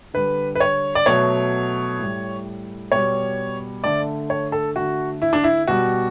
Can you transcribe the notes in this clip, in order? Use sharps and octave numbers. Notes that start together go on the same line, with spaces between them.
D3 G3 B4
B4
C#5
D5
B2 F#3 A3 C#5
A2 G3
B2 G3 C#5
D3 A3 D5
C#5
A4
D3 A3 F#4
E4
D4
E4
B2 G3 F#4